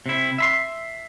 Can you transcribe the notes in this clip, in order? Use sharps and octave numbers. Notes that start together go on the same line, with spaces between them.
C3 E4
E5 B5 C6